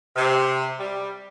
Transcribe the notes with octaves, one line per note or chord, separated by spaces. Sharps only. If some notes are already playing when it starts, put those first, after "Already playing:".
C3
G3